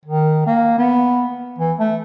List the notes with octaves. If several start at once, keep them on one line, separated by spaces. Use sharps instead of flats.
D#3
A#3
B3
E3
A3